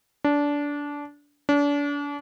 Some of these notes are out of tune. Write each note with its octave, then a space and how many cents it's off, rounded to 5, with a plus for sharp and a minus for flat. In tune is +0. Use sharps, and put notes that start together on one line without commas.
D4 -20
D4 -35